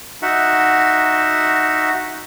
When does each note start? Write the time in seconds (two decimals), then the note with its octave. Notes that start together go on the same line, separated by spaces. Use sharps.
0.22 D#4 F#4 E5 F#5